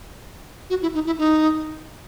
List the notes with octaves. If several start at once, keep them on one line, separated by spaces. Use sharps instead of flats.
F#4
E4
D#4
E4
D#4